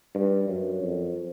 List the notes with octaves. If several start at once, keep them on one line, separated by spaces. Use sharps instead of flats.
G2
F#2
F2